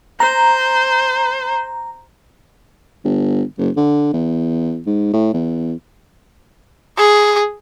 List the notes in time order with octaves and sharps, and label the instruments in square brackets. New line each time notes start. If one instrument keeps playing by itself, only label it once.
[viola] C5 [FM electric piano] A#5
[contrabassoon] G1
F#1
D3
E2
G#2
A2
E2
[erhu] G#4